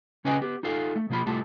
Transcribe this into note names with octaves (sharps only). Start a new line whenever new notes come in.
C#3 C#4 B4 D#5 G5 G#5
B3 G4
D#4 F4 A4 F5
A3
B2 F3 A#3 F4 B5
C2 A2 G3 A3 F4 A5